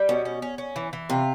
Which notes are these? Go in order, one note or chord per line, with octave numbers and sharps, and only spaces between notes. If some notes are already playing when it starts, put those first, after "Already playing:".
Already playing: G3
B2 C#4
C#4
C#4
C#4
E3
E3
C3 F4